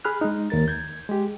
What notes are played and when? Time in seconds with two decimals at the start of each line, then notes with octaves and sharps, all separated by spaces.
0.05 G#4 B5 F6 F#6
0.21 G#3 D#4
0.50 D#2 A#4 A6
0.68 G6 G#6
1.09 G#3 G4